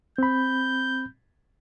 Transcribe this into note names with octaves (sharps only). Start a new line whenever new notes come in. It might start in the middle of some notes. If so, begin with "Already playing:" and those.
C4 B5 G6